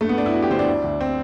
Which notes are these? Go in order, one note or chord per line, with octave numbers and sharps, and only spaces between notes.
G2 A3
B3
G2 D4
E4
G2 F#4
G4
D3 C5
D4
D2
D2
C4